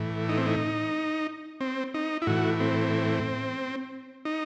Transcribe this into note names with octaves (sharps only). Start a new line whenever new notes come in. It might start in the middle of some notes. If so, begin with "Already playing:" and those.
Already playing: A2 E3
D#4
C4
D#4
C4
D#4
E4
A2 E3 F#4
C4
D#4